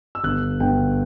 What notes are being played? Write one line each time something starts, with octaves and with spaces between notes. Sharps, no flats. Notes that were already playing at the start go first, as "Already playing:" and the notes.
E6
G1 F#6
G1 G5